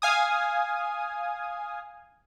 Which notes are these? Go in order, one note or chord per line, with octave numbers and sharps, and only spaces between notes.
F5 G#5 D#6